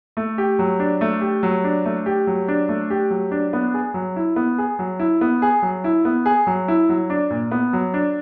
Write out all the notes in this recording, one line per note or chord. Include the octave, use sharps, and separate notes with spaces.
A3
G4
F#3
D4
A3
G4
F#3
D4
A3
G4
F#3
D4
A3
G4
F#3
D4
B3
G#4
F#3
E4
B3
G#4
F#3
E4
B3
G#4
F#3
E4
B3
G#4
F#3
E4
F#3
D4
A#2
B3
F#3
D4